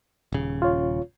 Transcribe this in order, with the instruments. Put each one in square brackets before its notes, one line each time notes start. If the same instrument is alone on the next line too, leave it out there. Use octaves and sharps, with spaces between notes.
[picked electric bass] D#1 C#3
[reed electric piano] F4 C#5